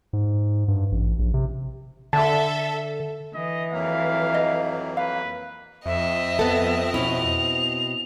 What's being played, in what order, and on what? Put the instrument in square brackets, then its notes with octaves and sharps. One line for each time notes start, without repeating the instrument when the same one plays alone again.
[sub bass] G#2
G2
A1
A#1
C3
[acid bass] D3 [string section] A4 E5 [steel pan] A5
[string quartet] E3 [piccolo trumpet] D#5
[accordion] F2 F#3 A#3 [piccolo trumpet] F5
[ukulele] D#5
[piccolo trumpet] B4 [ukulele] F5
[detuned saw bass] F2 [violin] C4 D#5 [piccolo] E5
[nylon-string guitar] B3 A4
[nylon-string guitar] B2 C#4 E4 [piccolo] F7